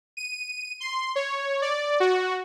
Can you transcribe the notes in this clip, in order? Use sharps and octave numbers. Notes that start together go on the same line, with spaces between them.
D#7
C6
C#5
D5
F#4